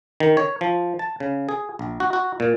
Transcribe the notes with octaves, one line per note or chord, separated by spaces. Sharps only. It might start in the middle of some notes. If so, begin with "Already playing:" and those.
D#3
C#5
F3
A5
C#3
G#4
A#1
F#4
F#4
A#2